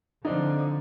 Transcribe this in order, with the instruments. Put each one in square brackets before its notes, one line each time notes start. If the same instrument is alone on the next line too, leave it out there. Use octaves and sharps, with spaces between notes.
[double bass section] D3 F3 [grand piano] C4 D4 D#4